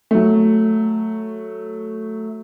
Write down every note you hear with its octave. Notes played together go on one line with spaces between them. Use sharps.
F#3 A3